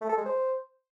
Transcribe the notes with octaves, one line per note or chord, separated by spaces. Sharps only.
A3
A4
G#3
C5